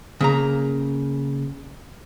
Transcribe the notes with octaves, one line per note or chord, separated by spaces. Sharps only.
C#3 A#3 A#5